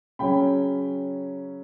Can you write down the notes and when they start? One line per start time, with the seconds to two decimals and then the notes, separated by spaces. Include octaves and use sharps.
0.19 C#3 F#3 C#4 G5 B5